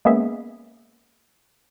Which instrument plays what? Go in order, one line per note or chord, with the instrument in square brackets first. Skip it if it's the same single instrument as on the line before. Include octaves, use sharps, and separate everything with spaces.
[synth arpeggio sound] G#3 A#3 B3 C#4 G#4 E5